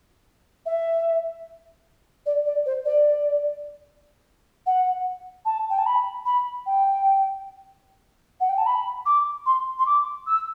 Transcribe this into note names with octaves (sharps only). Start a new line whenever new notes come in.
E5
D5
D5
C5
D5
F#5
A5
G5
A5
B5
B5
G5
F#5
G5
A5
B5
D6
C6
C6
D6
E6